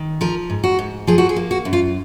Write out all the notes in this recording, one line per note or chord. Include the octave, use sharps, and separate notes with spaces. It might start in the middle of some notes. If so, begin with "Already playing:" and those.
Already playing: D#3
F3 A#4
G#2
F#4
G#2
F3 G#4
F#4
G#4
A#3
F#4
F#2
F4